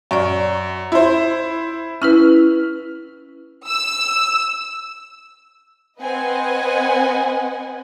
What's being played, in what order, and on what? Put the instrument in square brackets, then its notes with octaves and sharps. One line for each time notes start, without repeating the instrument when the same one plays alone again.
[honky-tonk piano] F#2 [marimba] D5 C#6
[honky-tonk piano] E4 C5
[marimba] C#4 E4 B4 [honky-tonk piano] F6
[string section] E6
[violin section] C4 B4 D#5 F#5 G#5